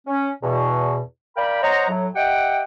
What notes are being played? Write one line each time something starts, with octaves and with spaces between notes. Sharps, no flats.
C#4
E2 B2
A#4 D5 F5 G5 B5
C5 C#5 D#5 F#5 A#5
A2 F#3
G4 D#5 E5 F#5 G5